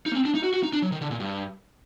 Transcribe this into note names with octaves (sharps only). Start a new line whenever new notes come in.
D#4
A#3
C4
D4
D#4
F#4
F#4
D#4
D4
F#3
D#3
D3
A#2
G2